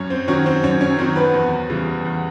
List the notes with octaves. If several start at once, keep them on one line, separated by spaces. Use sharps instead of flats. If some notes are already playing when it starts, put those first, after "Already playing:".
Already playing: F#2 C#4 C#5
C4 C5
D#3 F#3 C#4 C#5
C4 C5
F#2 C#4 C#5
C#4 C#5
D#3 F#3 C4 C5
B3 B4
E2
C#3 E3 G3
E2